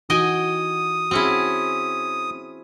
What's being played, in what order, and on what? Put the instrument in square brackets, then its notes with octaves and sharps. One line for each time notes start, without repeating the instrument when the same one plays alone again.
[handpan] E3 D#4 F#4 [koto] D#5 G5 G#5 [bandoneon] D#6
[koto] C4 C#4 E4 [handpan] F#4 G#4